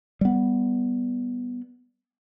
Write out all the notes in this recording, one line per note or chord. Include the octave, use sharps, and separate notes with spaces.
G3 B3